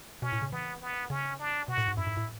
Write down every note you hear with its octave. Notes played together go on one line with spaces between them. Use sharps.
B2 C#4
A2
C#3
E3 B3
B3
C#3 C#4
D4
B2 F#4
A2
G#2
F#2 E4
G#2
A2